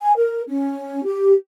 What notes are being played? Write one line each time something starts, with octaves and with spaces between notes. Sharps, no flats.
G#5
A#4
C#4
G4